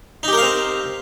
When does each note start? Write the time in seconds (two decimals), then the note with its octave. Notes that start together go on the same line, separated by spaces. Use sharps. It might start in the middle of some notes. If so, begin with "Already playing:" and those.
0.23 D#4
0.28 G4
0.33 A#4
0.38 F5
0.42 C4